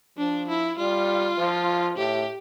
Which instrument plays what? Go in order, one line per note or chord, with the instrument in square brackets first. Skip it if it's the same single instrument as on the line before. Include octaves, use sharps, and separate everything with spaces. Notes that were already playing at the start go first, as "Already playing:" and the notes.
[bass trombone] F3 [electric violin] D4
[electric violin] E4
[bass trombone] G3 [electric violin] F4
[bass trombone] F3
[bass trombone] A2 [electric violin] G4